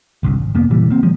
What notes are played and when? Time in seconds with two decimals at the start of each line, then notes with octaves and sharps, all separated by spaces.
0.23 G1 C2 G2
0.38 G#1
0.55 F1 A#3 B3
0.70 A#2 C#3 E3 G3
0.90 A#3 C4
1.03 D#3 F3 G#3